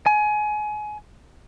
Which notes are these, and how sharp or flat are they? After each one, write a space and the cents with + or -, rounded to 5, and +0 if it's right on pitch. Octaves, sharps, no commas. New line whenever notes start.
G#5 +25